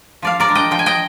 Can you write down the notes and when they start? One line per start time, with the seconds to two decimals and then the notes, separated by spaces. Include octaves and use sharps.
0.22 F3 D5 F5
0.40 A#4 D5
0.48 G#3 D4
0.55 D#5 G5
0.71 F3 G5
0.79 G#5
0.86 D#5 G5